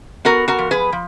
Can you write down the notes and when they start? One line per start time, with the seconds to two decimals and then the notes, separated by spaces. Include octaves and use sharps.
0.25 B3 F#4 A#4
0.48 F#4 A#4
0.59 F3
0.71 G#4 B4
0.92 F3